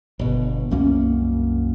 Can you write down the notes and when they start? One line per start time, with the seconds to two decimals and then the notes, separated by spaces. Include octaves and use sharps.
0.19 G1 B2
0.71 C2 F#2 A#3 C#4